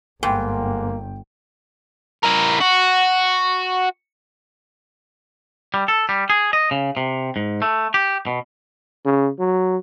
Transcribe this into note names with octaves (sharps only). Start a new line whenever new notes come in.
G1 G#2 A#3 G5
E4 A#4
F#4
G3
A4
G3
G#4
D#5
C#3
C3
G#2
A3
G4
B2
C#3
F#3